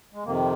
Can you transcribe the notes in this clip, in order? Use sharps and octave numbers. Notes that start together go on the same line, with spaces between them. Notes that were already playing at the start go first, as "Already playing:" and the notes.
G#3
F2 C3 D#3 A#3